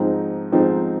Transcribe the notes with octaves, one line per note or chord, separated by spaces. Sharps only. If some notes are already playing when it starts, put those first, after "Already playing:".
Already playing: G#2 F3 C4 D#4
G#2 F3 C4 D#4